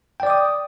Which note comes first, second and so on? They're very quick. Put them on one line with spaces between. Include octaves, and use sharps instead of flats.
G5 D5 D6 D#6